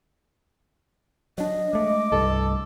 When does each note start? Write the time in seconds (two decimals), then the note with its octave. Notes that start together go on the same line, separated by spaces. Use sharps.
1.38 F#3 D4 D#5
1.73 G#3 A3 D6
2.12 C2 G2 A4